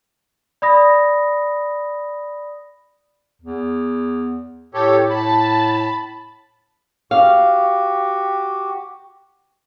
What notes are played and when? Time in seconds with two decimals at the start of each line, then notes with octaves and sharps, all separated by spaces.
0.62 D5 B5 D#6 A#6
3.42 E2
4.74 A2 G4 A4 C#5
5.10 A2 A5 B5
7.11 F#4 G4 F5